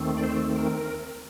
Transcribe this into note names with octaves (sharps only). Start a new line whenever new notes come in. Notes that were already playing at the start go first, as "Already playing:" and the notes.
Already playing: D#2 D#3 A3 C4
D5
C5
A#4